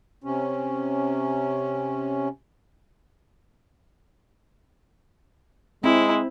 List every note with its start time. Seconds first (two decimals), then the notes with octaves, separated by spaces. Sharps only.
0.24 C3 C#4
5.84 G#3 C4 E4